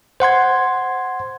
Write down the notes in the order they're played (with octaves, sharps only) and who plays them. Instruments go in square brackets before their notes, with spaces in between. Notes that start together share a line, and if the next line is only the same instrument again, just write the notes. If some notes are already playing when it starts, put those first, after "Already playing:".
[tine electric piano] C5 F#5 C6 G#6